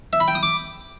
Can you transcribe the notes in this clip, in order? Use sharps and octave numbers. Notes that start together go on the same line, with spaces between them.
E5
B5
G5
D#6
D6